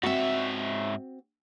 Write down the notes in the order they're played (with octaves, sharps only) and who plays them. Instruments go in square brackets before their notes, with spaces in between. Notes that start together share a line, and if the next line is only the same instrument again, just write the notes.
[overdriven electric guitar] G#2 E5 [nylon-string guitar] C4 F#4